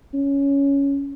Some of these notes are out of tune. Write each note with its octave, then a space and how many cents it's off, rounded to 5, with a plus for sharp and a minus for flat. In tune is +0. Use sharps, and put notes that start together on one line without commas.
C#4 +10